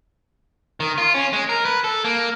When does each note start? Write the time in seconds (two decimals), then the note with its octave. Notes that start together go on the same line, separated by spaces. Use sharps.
0.80 D#3
0.98 F4
1.14 C#4
1.33 G#3
1.49 A#4
1.65 B4
1.84 A4
2.04 A#3